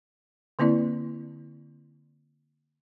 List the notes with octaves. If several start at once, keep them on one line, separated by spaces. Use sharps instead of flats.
D3 A#3 C4 E4 D5